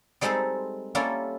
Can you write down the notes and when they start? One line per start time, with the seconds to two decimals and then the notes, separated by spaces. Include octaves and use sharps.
0.21 G3 G#3 C4 D#4 A4 C5
0.95 G3 A#3 C#4 E4 F4 A4